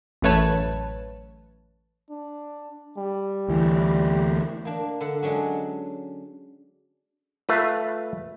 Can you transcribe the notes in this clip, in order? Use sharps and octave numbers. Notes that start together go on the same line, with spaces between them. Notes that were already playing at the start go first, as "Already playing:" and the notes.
A1 F#2 A3 B4 C#5 A5
D4
G3
D2 E3
A#3 D4
D3 F#5
F#3 G#3 C#4 D4 F#4
A3 F4 A#4 B4 E5 F5